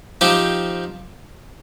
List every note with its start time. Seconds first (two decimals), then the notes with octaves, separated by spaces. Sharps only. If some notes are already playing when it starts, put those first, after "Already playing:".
0.21 F3 C4 D#4 G4